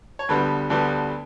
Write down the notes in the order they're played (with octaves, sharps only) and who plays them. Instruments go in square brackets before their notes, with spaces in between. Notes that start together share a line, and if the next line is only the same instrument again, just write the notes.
[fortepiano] C#5
D2 D3 G3 B3 B4
D2 D3 G3 B3